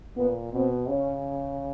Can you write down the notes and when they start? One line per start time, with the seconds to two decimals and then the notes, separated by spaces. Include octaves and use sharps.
0.16 A#2 B3
0.53 B2 C4
0.89 C#3 C#4